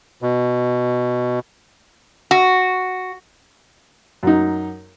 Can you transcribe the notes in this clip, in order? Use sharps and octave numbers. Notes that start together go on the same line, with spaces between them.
B2
F#4
F#2 D#4